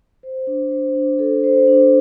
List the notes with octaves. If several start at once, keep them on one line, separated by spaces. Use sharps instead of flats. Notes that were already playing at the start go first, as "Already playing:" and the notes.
C5
D4
C5
D4
A4
C5
D4